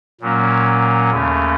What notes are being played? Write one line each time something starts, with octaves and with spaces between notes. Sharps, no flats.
A#2 F#3 A#3 C#4
D#2 C#3 A3 C#4